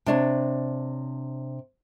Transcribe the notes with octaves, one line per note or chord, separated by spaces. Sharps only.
C3 D4 C#5